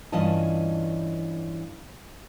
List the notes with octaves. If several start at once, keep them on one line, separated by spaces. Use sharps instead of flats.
G2 E3 C#4 F4 D#5 A5